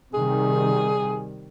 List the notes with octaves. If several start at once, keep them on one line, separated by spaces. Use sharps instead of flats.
C3 D#3 G3 G#4